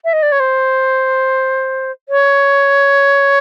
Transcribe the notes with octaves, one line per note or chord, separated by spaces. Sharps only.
E5
D#5
D5
C#5
C5
C#5